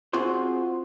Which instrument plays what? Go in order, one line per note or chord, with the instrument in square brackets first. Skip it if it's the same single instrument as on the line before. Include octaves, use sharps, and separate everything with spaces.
[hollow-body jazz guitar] C4 F4 F#4 G#4 C5